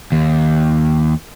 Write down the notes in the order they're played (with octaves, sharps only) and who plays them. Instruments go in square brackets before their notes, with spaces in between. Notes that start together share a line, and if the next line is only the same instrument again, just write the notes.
[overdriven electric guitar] D#2